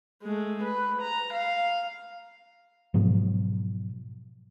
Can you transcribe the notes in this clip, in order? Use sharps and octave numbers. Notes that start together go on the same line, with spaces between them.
G#3 A3
B4
A#5
F5
G#2 B2 F3 F#3